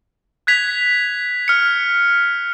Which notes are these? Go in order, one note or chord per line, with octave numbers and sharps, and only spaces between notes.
F#6 G#6 B6 F7
F6 C#7